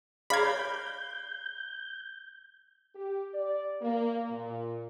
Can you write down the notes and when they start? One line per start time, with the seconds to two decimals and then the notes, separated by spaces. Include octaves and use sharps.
0.30 G#4 C#5 D5 F5 A#5 B5 G#6
0.44 G6
2.94 G4
3.33 D5
3.82 A#3
4.30 A#2